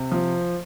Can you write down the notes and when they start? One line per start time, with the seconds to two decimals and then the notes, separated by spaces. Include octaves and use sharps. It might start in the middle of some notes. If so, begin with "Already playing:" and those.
Already playing: C3
0.12 F3